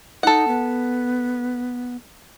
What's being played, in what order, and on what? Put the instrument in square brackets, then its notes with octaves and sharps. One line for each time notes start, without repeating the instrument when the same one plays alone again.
[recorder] D#4 [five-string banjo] A4 F#5
[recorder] B3